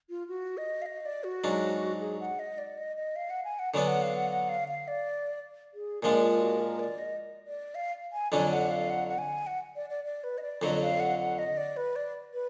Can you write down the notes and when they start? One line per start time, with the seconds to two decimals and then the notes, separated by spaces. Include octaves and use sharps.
0.10 F4
0.28 F#4
0.58 D#5
0.82 F5
0.86 D#5
1.06 D5
1.24 F#4
1.44 G#2 F#3 D4
2.01 G#4
2.20 F#5
2.39 D#5
2.58 D5
2.78 D#5
2.96 D#5
3.16 F5
3.30 F#5
3.44 G#5
3.59 F#5
3.73 D3 F#3 B3 D4 G#5
3.88 F#5
4.02 F5
4.16 F#5
4.30 F#5
4.49 F5
4.68 F5
4.88 D5
5.74 G#4
6.03 A#2 F3 G#3 D4 F4
6.22 F4
6.41 F#4
6.60 A#4
6.79 D5
6.98 D#5
7.46 D5
7.75 F5
8.13 G#5
8.32 F2 D3 F#3 D4 G#5
8.52 F#5
8.70 F5
8.90 F#5
9.08 F#5
9.18 G#5
9.47 F#5
9.76 D5
9.90 D5
10.05 D5
10.24 B4
10.38 D#5
10.42 D5
10.62 F2 D3 F#3 D#5
10.81 F5
11.00 F#5
11.19 F#5
11.39 D#5
11.57 D5
11.77 B4
11.96 D5
12.34 B4